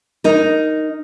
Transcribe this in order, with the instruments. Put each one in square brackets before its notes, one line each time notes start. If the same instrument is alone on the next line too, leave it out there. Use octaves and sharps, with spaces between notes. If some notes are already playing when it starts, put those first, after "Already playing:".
[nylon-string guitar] D#4 A#4